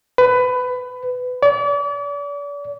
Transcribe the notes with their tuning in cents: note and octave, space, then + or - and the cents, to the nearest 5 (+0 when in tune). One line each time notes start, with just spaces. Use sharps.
B4 +20
D5 -40